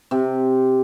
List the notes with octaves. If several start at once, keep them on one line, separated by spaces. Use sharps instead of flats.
C3